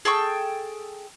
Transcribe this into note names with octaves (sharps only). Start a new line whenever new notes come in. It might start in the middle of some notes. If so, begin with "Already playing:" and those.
G#4 A4 G5 C#6